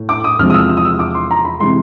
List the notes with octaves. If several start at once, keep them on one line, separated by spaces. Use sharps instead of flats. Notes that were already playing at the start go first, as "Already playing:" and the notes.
Already playing: A2
D6
D#6
E2 C3 F3 G#3 F6
D#6
E6
E6
D#6
E6
D6
C6
A#5
B5
C3 E3 G#3 C6